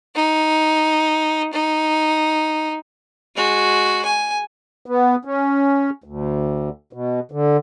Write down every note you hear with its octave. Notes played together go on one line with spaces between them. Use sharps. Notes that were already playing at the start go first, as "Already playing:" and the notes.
D#4
D#4
G#3 F#4
G#5
B3
C#4
D2
B2
D3